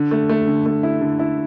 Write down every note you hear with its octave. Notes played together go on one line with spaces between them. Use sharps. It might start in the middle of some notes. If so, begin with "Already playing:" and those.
Already playing: D3
A3
A3
D3
A3
E4
D3
E4